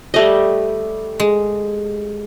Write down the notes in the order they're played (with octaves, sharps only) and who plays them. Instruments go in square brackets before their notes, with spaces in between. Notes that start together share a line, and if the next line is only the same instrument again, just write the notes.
[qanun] G3 A3 D#5
[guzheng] G#3